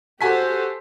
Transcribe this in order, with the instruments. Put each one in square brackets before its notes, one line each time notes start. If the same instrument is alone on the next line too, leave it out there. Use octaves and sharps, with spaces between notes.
[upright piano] F#4 G#5 B6 [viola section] G4 A4 C5